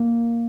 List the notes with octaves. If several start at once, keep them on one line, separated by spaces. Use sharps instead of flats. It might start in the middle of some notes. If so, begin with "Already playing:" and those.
Already playing: A#3